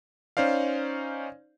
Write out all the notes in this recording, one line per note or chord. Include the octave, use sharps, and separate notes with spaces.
C#4 D#4 C5 D5 F5